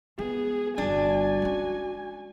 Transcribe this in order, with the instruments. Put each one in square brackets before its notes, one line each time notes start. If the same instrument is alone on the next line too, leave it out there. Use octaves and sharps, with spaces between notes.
[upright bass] G#3 [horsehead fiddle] B3 G#4
[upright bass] G1 G3 [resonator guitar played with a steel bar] D4 [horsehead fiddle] F#4 G#5
[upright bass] G#3 C#4